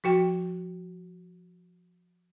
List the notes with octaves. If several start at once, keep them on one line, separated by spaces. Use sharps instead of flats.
F3 F#4 G5